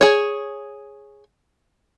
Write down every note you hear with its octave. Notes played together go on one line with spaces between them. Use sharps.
G#4 C#5